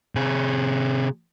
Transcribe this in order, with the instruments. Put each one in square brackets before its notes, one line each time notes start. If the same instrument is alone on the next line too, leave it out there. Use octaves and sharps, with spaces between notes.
[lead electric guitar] C3 G#4